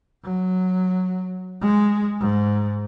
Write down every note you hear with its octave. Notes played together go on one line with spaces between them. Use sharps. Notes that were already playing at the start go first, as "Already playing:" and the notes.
F#3
G#3
G#2